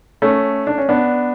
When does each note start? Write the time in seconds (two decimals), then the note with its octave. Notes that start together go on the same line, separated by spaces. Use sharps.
0.22 A3 C#4
0.67 D4
0.78 C#4
0.89 B3 D4